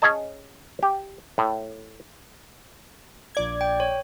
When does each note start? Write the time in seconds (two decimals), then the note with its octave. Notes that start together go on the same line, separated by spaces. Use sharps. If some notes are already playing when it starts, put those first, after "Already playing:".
0.02 C#4 G#4 C#5 D#5 A5
0.83 G4
1.38 A2
3.35 A#1 D5 G#6
3.61 G5
3.80 C#5